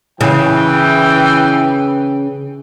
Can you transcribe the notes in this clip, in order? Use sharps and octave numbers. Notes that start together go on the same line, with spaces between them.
C#3 E3 G5